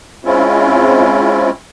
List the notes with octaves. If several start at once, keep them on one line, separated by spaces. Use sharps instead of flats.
G#3 C4 C#4 E4 F4